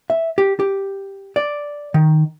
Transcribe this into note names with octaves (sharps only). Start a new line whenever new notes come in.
E5
G4
G4
D5
D#3